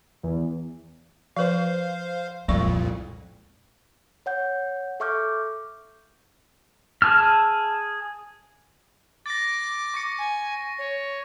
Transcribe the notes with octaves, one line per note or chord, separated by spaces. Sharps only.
E2
F3 B4 C5 F5
C2 F2 A#2 F3 G#3 D5 C#6
C#5 F#5 G6
A4 E5 C#6 D6 F6 G6
G#4 A5 E6 F6
D6 A6 A#6
C#6 A#6 C#7
G#5
C#5